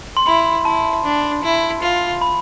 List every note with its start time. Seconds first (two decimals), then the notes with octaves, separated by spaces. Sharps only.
0.17 C6
0.26 E4 B5
0.65 E4 A5
1.04 D4
1.43 E4
1.82 F4
2.21 B5